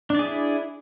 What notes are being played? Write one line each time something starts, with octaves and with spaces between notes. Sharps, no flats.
D4 E4 G#4 D5